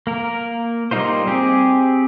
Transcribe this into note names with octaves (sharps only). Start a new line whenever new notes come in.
A#3 A#4
G3 A#3 D#4 F4 C5
C4 G4 G#4